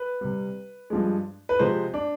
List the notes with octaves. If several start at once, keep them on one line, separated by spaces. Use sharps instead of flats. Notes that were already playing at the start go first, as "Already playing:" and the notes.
Already playing: B4
C3 G3
G2 F3 G#3
B4
C3 F3 G#3 C5
D4